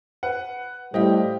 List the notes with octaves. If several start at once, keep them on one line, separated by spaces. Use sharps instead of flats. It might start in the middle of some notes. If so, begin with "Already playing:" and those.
B4 F#5
A2 G3 G4 C5 D#5 F5